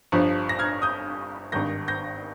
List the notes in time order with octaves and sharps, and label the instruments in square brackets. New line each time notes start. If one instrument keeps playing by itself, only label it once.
[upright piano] G1 G2 F3
A#6
F6 G#6
D#6 G6
G#1 G2 D#3 G6 A#6
G6 A#6